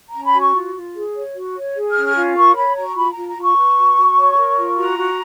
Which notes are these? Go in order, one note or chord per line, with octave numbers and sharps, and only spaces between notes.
C#4 A#5
B5
F#4
C#6
F4
F4
G#4
C#5
F#4
C#5
G#4
F6
C#4
F6
F4
A#4 C#6
C#5 B5
F#4 A#5
F4 B5
A#5
F4
A#5
F4 C#6
B4
F#4
F#4
C#5
A#4
F4
F#4 A#5
F#4